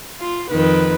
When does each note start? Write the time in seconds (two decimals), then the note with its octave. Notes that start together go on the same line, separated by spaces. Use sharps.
0.20 F4
0.51 F2 D#3 B4